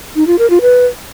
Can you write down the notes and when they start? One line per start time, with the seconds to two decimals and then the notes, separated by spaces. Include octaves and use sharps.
0.16 D#4
0.27 F4
0.39 A#4
0.50 F4
0.61 B4